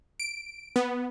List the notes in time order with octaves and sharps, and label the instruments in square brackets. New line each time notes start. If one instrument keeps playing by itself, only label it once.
[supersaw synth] D7
B3